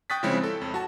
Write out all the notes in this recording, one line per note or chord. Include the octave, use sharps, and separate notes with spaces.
G5 C#6 D#6 F#6 A6 B6
C#3 F3 G#3 C4 E4 C#5
A4
F2
F#4 A5